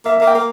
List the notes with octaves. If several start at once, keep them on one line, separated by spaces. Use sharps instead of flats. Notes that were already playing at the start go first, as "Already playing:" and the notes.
A#3 E5
A#3 E5
G5
A#3